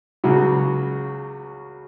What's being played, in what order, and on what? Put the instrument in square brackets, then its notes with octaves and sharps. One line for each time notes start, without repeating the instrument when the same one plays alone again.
[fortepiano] C#2 C#3 F#3 [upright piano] F#4